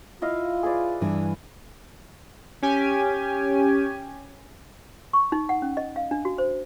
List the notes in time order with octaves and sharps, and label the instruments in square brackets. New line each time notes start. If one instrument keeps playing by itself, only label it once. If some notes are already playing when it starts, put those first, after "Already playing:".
[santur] E4 D#5 F5 [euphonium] F4
[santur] G#4 B4 D5
[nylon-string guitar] G2 E3 D4
[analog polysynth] C#4 G4 G#5
[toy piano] C#6
D#4
F#5
C#4
D#5
F5
D4
F#4
C5